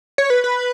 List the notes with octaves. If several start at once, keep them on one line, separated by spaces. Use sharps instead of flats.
C#5
B4
B4